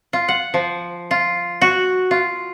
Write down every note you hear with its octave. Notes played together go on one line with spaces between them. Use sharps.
F4
F#5
F3
F4
F#4
F4